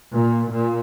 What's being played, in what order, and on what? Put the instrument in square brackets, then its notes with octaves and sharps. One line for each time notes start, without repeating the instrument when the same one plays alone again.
[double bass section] A#2
A#2